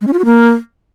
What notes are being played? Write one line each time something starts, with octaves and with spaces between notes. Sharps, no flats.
G#3
C#4
F4
F#4
A#3